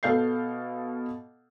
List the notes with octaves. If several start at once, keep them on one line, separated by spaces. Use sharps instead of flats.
B2 A4 F5 G6 C7